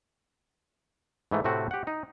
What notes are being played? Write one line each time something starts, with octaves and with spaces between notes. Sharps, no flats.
G#2 E3 A3
A2 C3 A3 C4 F#4
G4 F#5
D#4